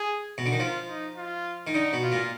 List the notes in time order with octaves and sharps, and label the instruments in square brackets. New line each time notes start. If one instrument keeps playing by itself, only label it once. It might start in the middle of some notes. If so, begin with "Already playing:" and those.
Already playing: [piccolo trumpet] G#4
[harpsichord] B2
D3
D#3
[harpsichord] F3 [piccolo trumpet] F4
[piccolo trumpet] D#4
F4
[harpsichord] D#3
[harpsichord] D3 [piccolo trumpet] D#4
[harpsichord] B2
[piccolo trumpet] F4
[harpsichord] A#2